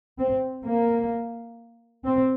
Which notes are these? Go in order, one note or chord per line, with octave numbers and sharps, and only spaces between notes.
C4
A#3
C4